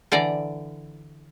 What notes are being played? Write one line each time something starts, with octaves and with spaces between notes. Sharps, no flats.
D3 E3 D5 A#5